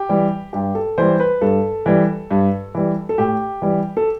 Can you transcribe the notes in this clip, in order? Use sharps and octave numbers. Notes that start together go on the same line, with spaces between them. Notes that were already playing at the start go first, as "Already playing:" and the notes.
Already playing: G4
E3 G3
G2 G4
A4
E3 G3 C5
B4
G2 A4
E3 G3
G2
E3 G3
A4
A2 G4
E3 G3
A4